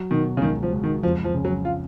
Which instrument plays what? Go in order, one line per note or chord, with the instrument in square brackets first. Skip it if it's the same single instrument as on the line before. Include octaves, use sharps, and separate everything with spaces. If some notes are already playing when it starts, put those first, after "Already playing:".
Already playing: [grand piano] F#3
[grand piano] B2 [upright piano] D#3
[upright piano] C#3
[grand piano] C#2 [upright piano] D#3
[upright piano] F3
[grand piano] C#2
[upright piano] D#3
[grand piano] F2 [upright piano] F3
[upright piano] F3
[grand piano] C#3
[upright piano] F#3
F4